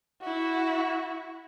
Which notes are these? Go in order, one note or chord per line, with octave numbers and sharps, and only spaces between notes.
E4 F#4